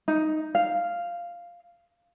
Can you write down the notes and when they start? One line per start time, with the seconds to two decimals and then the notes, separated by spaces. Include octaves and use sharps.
0.08 D#4
0.55 F5